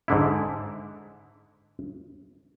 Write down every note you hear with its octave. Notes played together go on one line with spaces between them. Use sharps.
G#2 D3 E4